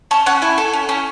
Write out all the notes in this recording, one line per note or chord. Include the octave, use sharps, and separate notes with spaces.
C#4 A4
C#4 F#5
E4 G#5
A4
C#4
C#4